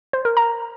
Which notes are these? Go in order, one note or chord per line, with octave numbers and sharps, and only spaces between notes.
C5
A#4
A#5